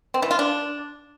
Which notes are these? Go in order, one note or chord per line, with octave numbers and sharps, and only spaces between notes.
C4
E3
F4
D4